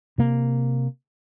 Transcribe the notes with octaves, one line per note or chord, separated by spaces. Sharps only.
C3 A#3